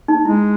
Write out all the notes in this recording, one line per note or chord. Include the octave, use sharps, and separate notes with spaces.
D#4
G#3 E4